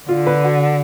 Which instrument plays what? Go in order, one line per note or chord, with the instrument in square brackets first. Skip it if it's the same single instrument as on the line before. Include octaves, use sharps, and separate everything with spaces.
[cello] D3 [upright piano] F4
[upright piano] B4
F#4